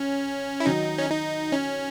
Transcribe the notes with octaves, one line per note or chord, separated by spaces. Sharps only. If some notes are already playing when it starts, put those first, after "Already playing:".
Already playing: C#3 C#4
E4
D#3 F#3 D#4
C#4
D#4
C#4